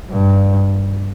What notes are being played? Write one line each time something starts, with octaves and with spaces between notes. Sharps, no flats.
G2